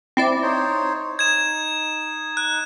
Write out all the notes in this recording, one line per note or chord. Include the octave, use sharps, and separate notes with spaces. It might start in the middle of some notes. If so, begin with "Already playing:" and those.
C4 E4 D5
D#4 C5 C#5
D#4 G#6 E7
F#6